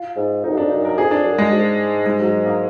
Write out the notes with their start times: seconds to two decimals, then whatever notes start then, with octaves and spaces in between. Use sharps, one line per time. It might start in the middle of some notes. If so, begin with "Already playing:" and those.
Already playing: F4
0.16 G#2
0.44 F2 D#4
0.51 F#2
0.57 F2 D4
0.71 F#2 D#4
0.85 A#4
0.98 F2 G#4
1.11 D4
1.25 F#2
1.38 G#3
1.52 G#2
2.06 G#3
2.20 F#3
2.46 A#3